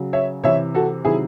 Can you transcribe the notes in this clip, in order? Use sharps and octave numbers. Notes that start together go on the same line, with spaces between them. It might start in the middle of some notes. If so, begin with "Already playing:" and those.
Already playing: C#3 F#3
C#5 E5
C3 E3 C#5 E5
F#4 A4
C3 D#3 F#3 E4 G#4